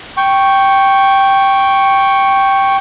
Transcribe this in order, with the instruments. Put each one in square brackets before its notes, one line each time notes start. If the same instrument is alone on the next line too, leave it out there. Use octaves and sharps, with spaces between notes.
[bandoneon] G5 C#6